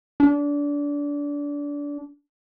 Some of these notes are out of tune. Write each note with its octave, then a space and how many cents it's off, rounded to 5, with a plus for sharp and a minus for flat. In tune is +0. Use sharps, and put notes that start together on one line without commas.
D4 -25